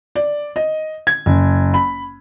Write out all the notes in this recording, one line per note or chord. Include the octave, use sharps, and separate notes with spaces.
D5
D#5
G#6
F#1
B5